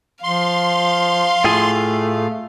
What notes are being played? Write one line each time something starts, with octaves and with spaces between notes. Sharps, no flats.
F3 F5 C6
A2 A3 F4 G#4